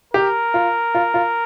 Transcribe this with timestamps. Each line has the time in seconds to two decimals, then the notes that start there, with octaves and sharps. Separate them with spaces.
0.13 G4 A#4
0.54 F4
0.95 F4
1.14 F4